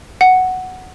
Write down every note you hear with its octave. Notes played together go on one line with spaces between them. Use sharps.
F#5